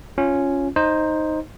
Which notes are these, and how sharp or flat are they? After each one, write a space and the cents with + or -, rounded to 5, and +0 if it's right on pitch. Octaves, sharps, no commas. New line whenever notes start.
C#4 +0 F4 +0
D#4 +0 C5 +10 D#5 +0